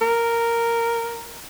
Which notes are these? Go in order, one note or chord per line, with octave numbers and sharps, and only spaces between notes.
A#4